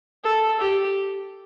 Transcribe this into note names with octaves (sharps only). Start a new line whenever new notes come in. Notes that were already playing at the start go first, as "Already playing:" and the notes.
A4
G4